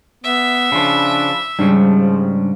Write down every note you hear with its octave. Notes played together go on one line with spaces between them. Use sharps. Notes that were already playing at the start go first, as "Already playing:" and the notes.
B3 E5
C#3 F3 D4 B5
G#2 C#3 F3 G3 D4